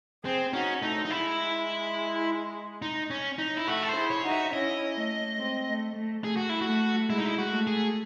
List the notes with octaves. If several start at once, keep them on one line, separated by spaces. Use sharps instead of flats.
C4 G#4 C5
C#4 D#4 F#4
A3 D#4
D#4
G#3 E4
D#4
C#4
D#4
E4
A3 F#4
A4
C5
E4 G#4
C#5
D#4 F#4
E5
C#4 E4 D#5
A3
G#3 C4
A3
A3
A3 G#4
F#4
E4
F#4
A3
G#3 E4
D#4
E4
F#4
A3
G#4